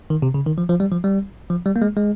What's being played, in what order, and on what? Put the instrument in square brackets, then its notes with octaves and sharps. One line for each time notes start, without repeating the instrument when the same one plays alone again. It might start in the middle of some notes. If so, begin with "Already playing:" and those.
[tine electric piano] D#3
C3
C#3
D#3
F3
F3
G3
F3
G3
F3
G3
A#3
G#3
G#3